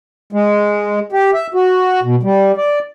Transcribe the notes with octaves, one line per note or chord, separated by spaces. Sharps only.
G#3
G4
E5
F#4
B2
G3
D5